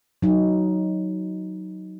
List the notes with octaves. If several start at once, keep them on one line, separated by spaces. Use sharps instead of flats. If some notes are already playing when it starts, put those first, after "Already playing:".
F#3 D#4